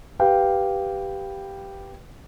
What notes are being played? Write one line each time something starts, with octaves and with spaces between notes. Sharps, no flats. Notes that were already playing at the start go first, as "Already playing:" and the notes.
G4 B4 F5 G5